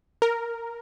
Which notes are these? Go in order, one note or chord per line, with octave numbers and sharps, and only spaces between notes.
A#4